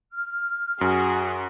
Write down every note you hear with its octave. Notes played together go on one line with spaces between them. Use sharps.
F6
F#2 F#4 G#4